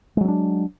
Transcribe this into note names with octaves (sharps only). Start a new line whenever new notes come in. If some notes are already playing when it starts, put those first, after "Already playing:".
F#3 G#3 C4 D4